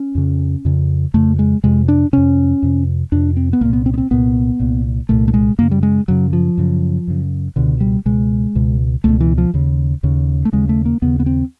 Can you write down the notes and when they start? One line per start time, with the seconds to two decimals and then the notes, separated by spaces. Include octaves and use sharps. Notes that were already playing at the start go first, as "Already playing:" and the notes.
Already playing: C#4
0.15 F2 C#3
0.65 F2 C#3
1.14 F2 C#3 A3
1.39 G#3
1.64 F2 C3 G#3
1.88 D4
2.13 F2 C3 C#4
2.62 F2 C3
3.12 F2 C3 D4
3.37 C4
3.53 B3
3.61 C2 A#3
3.65 A#2
3.73 B3
3.86 C4
3.94 B3
3.98 C4
4.11 C2 A#2 B3
4.60 C2 A#2
5.09 C2 A#2 A3
5.28 A3
5.34 G#3
5.58 F#2 C#3 A#3
5.71 G3
5.83 G#3
6.08 F#2 C#3 F#3
6.33 F3
6.57 F#2 C#3
7.07 F#2 C#3
7.56 C#2 B2 D3
7.80 G3
8.06 C#2 B2 G#3
8.55 C#2 B2
9.04 C#2 B2 A3
9.21 E3
9.38 F3
9.54 D#2 C#3
10.03 D#2 C#3
10.45 A3
10.53 D#2 C#3 G#3
10.69 A3
10.86 A#3
11.02 D#2 C#3 B3
11.20 B3
11.26 C4